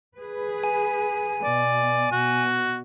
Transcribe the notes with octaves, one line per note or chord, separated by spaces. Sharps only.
G#4 B4
G#5
B2 D5
B2 F#4